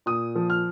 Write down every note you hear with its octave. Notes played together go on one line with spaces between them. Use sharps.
A#2 D#6
F3
F6